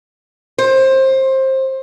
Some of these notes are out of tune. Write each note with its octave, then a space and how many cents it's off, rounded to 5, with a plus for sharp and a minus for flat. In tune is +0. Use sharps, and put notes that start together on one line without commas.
C5 +20